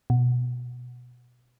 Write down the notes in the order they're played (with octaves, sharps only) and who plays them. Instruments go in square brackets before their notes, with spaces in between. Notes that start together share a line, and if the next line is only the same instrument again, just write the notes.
[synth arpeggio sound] B2